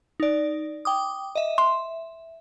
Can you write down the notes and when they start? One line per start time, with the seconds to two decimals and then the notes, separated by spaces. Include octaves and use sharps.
0.20 D#4 D5
0.85 G5 D6 D#6
1.35 D#5 E5
1.58 E5 C6